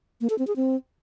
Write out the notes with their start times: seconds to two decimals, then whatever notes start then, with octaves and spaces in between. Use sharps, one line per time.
0.21 A#3
0.30 A4
0.39 C4
0.47 G#4
0.56 C4